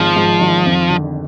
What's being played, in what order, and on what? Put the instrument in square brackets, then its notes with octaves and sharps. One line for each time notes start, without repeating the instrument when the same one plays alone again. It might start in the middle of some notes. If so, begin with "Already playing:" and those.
Already playing: [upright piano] G#1 D#3 G#3 [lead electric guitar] F3
[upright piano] G#2
D#3
F2
D3